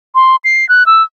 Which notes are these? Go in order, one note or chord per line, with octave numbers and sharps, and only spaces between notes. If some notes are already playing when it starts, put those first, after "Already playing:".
C6
C7
F#6
E6